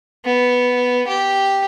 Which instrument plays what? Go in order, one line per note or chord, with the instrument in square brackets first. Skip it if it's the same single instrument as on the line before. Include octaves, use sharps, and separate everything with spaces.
[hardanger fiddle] B3
G4